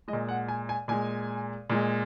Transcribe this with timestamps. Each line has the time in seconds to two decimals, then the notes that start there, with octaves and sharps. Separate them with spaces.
0.08 G#3 D#5
0.13 A#2
0.29 F#5
0.48 G#5
0.69 G#5
0.88 A#2 G#3 G#5
1.70 A#2 G#3